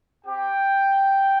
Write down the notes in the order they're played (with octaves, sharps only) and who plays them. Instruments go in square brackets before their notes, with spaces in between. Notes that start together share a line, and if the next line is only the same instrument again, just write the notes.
[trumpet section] C4 G4 G5